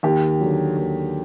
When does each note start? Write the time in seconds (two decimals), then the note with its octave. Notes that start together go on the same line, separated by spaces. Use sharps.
0.03 D#2 G4
0.40 D3 F#3
0.77 D#2